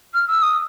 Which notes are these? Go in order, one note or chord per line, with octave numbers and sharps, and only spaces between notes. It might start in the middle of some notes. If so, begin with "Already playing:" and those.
F6
E6
D#6